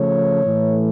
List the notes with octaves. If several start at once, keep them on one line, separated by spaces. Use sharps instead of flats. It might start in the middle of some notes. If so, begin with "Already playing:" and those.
Already playing: C#3 F3 A3 C#5
A2 E3 A3